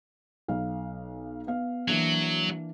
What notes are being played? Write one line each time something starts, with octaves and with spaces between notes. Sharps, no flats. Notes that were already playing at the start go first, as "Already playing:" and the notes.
B1 F5
B3 F5
E3 F#3 A#3 D4